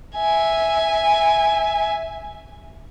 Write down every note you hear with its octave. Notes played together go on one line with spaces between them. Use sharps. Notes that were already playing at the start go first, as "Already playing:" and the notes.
E5 G#5